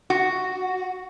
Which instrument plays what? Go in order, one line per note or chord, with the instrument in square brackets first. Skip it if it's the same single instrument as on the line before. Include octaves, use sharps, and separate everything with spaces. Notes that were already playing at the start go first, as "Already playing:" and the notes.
[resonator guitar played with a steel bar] F#4